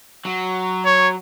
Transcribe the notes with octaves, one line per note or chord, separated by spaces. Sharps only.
F#3
C#5